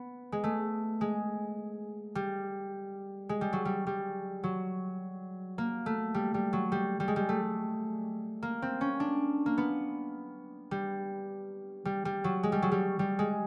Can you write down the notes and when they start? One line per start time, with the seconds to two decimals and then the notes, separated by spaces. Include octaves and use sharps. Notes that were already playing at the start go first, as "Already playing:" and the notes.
Already playing: B3
0.32 G#3
0.44 A3
1.01 G#3
2.15 G3
3.29 G#3
3.41 G3
3.53 F#3
3.65 G3
3.87 G3
4.44 F#3
5.58 A#3
5.86 A3
6.14 G3
6.34 G3
6.53 F#3
6.72 G3
7.00 G3
7.08 G#3
7.16 G3
7.29 A3
8.43 A#3
8.62 C4
8.81 C#4
9.00 D4
9.46 A#3
9.58 B3
10.71 G3
11.85 G3
12.05 G3
12.24 F#3
12.43 G#3
12.52 G3
12.62 F#3
12.72 G3
12.99 G3
13.19 G#3